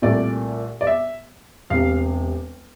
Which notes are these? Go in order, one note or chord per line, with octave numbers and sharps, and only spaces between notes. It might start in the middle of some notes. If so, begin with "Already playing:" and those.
C2 A#2 A3 D5
D5
E5
E1 C3 F5